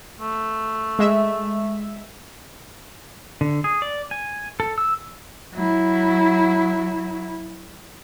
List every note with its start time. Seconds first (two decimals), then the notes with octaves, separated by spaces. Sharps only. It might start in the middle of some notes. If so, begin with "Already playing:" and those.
0.19 A3
0.99 G#3 E5
3.41 D3
3.64 G#4
3.82 D5
4.11 G#5
4.60 A4
4.78 E6
5.54 F#3 E4